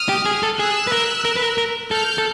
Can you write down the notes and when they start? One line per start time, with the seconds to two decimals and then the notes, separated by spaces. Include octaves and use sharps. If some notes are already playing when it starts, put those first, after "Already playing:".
Already playing: D#6 F6
0.09 G4
0.26 G#4
0.43 A4
0.59 G#4 E6 F#6
0.87 B4
0.92 A#4
1.25 A#4
1.36 B4
1.42 A#4
1.58 A#4
1.91 A4 F6 G6
2.18 A4